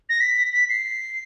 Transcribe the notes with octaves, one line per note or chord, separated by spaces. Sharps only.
A#6
B6
B6
C7